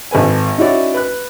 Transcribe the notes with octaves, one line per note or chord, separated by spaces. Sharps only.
G#1 A4 B4 G#5
C#4 D#4 E4 F#4 C#5 D5
B4 F#6